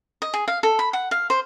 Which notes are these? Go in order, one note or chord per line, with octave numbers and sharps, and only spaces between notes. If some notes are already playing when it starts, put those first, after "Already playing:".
D#5
G#4
F5
A4
B5
F#5
F5
C5